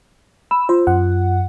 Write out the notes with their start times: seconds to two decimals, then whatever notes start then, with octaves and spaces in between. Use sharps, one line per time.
0.51 B5 E6
0.69 F4 C5
0.87 F#2 F#5